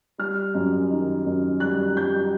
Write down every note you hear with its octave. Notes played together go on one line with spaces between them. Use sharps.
G3 F6
F#2
D#3
F#2
G3 F#6
G3 G6